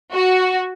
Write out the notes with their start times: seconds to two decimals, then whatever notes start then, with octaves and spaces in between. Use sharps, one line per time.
0.13 F#4